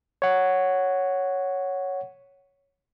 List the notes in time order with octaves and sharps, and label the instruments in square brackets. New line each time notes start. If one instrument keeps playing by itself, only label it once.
[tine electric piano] C#5 F#5